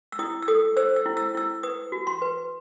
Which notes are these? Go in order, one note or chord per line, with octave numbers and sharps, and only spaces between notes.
E6
E4 D#6
E6
A4 D#6
C5 E6
E6
E4
E6
E4 E6
B4 D#6
F#4
C6
B4